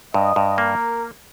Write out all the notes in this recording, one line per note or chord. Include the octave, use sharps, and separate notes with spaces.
G2 D#5
G2
A#3 A#4